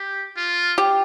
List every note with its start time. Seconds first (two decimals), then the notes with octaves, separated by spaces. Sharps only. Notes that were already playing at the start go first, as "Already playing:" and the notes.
Already playing: G4
0.36 F4
0.78 G4